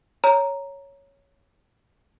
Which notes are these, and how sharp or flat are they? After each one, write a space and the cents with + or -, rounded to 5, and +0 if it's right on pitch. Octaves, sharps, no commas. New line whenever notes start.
C#5 +0 A#5 +0